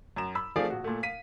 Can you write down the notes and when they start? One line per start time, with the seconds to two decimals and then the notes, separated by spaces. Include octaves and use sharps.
0.16 F#2 A#5 E7
0.35 B5 E6
0.56 F3 A3 C4 G#4 D5 F5
0.70 A#1 F#4
0.84 A#2 A3
1.03 F5 B6 D#7